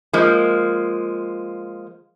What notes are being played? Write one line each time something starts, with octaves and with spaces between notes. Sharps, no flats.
F3 G#3 A#3